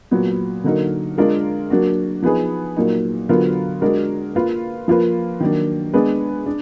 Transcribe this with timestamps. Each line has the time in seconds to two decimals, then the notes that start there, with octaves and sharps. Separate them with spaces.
0.11 A#2 F#3 B3
0.64 D3 F#3 A#3 D#4 A#4
1.18 G#3 D4 F4 A#4
1.70 F#3 A#3 D4 F#4
2.22 F3 B3 D#4 G#4 B4
2.77 A#2 F#3 A#3 D#4
3.29 D3 F#3 B3 F4 A#4
3.81 G#3 D4 F#4 A#4
4.35 A#3 F4 B4
4.88 F3 A#3 F4 B4
5.40 D#3 F#3 A#3 D4
5.94 G#3 B3 D4 G#4 B4
6.46 D4